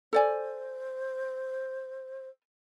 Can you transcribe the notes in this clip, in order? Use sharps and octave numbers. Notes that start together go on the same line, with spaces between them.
A4 C5 D5 G#5